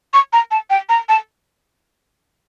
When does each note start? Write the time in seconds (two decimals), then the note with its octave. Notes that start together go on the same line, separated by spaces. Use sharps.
0.14 C#6
0.33 A#5
0.51 A5
0.70 G5
0.89 A#5
1.09 A5